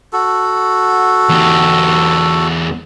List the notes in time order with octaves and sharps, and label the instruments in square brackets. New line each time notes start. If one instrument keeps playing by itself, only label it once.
[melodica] F#4 A4
[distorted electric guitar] E2 G4